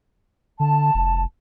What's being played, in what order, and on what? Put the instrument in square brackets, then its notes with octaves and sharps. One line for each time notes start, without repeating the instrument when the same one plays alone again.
[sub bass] D3 [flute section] A5
[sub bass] F1